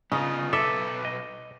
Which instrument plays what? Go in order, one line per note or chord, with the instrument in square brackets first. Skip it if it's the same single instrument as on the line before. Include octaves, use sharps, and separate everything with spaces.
[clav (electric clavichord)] C#3 [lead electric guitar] B3 F4 [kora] D#4
[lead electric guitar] B1 B4 [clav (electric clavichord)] A4 [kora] E5 [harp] D6
[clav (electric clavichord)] D#5